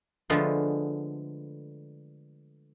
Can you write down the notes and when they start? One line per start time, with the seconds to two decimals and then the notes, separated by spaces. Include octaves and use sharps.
0.30 D3 F3 G#3 A3 B3 F4